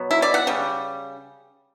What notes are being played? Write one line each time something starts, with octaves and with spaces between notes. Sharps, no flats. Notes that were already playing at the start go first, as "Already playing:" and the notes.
Already playing: B2 F#3 B3
E4
D5
F#5
C#3 G3